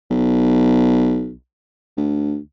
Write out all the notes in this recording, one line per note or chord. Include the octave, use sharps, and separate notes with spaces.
B1
D2